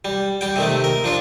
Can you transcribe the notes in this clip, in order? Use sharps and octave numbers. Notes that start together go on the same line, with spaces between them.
G3
G3 G5
C3 D#3 A3
A#4
F3 D4 F4